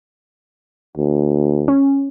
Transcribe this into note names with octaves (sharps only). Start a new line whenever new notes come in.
D2
C#4